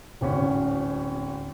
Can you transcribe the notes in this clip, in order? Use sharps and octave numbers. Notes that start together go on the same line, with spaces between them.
D1 G#1 C#4